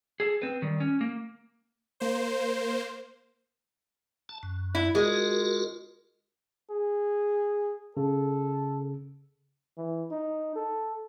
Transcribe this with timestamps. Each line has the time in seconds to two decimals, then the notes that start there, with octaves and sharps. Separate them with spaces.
0.20 G#4 A4
0.42 C4 B4
0.62 D#3 G3
0.80 C#4
1.01 A#3
2.00 A#3 C5
4.29 A5
4.43 F#2
4.75 E4
4.95 G#3 F4 F#4 A#4
6.71 G#4
7.97 C#3 A4
9.77 E3
10.11 D#4
10.56 A4